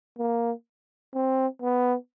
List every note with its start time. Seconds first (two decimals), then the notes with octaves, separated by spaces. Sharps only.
0.19 A#3
1.14 C4
1.62 B3